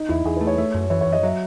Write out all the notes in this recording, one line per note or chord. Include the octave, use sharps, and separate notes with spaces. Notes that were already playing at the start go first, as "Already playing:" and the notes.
Already playing: D#4
E2 E4
E2 G#4
B4
A3
C#5
A3
F#2
E3 C#5
C#5
F#2
D#5
F#3 E5